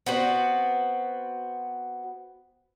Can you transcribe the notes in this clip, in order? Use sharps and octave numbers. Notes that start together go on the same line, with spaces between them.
B3 C4 F#4